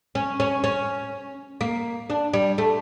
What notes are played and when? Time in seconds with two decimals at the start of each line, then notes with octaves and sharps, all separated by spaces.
0.15 C#4
0.40 C#4
0.64 C#4
1.61 A#3
2.10 D4
2.33 G3
2.58 A3